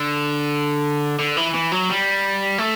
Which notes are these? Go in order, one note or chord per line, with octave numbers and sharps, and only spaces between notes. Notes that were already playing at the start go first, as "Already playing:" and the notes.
Already playing: D3
D3
E3
E3
F#3
G3
A3